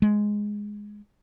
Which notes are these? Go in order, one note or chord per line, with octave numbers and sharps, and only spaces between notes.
G#3